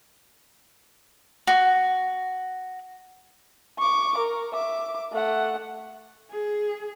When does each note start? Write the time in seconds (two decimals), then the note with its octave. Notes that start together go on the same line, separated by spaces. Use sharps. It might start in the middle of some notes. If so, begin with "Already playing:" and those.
1.47 F#4
3.78 C#6 D6
4.17 A#4
4.54 E5 D6
5.12 A3 F#5
6.31 G#4